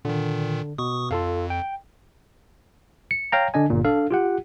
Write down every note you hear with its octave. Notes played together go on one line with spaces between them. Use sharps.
A#2 D3 D#3
B2 C#6 D#6
F2 F4 A4 F5
G5
C#7
C#5 F5 G5 A#5
D3 D4 D#5 G#5
G1 A#2
D4 A4 F5
F4 G4 F#5